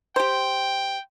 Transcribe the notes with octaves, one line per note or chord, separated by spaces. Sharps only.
G4 C5 G5